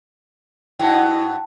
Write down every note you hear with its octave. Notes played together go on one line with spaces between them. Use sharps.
G2 F#3 B3 E4 G5 A5